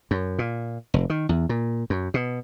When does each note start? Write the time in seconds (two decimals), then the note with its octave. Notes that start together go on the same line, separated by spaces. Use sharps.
0.11 F#2
0.39 A#2
0.94 F1
1.10 D#3
1.29 E2
1.49 A#2
1.90 F#2
2.14 B2